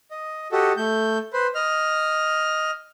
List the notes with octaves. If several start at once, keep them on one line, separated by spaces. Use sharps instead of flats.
D#5
F#4 G4 A4 D#5
A3 G6
B4 C5
D#5 F6